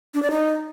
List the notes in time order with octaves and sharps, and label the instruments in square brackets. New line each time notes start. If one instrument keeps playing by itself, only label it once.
[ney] D4
D5
D#4